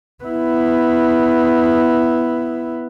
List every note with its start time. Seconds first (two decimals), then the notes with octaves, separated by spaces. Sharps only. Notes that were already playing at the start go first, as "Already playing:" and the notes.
0.24 B3 E4